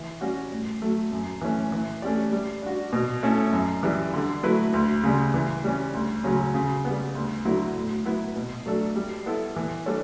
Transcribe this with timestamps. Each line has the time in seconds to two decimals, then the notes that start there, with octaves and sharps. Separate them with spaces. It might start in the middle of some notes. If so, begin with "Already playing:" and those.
Already playing: E3
0.21 G3 C#4 F#4
0.51 A2
0.82 F#3 A3
1.12 F#2
1.41 E3 A3 C#4
1.72 E3
2.02 A3 C#4 G4 D5
2.32 G3
2.63 D4 F#4
2.93 B2
3.23 A3 C#4 E4 A4
3.53 F#2
3.83 E3 G3
4.13 D3
4.43 F#3 A3 E4 B4
4.74 D2
5.04 C#3 G3
5.34 E3
5.64 G3 C#4
5.94 D2
6.24 C#3 F#3 C#4
6.54 C#3
6.85 G3 B3
7.15 D2
7.45 D3 F#3 B3 E4
7.75 A2
8.05 F#3 B3 E4 B4
8.36 B2
8.66 F#3 A3 D4 A4
8.96 G3
9.26 B3 E4 A4
9.56 E3
9.86 G3 D4 A4 C#5